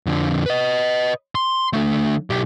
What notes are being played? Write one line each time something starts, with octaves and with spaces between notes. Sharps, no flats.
F2 D3
B4 D#5
C6
D3 A3
B1 G4